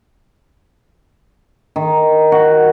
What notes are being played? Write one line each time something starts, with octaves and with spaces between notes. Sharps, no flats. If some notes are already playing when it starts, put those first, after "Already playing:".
D#3
F#4